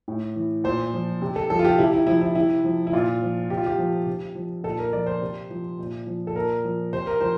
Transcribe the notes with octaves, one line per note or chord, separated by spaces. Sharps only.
A2
E3
A#2 C5
F3
C3
A4
F3 A4
F4
G4
C3 E4
E4
F3 E4
E4
C3 E4
F3
E4
A#2 F4
F3
C3 G4
F4
G4
F3
C3
F3
A#2 A4
A#4
F3 D5
C5
C3
F3
A#2
F3
A4
A#2 A#4
F3
C3 C5
A#4
F3 C5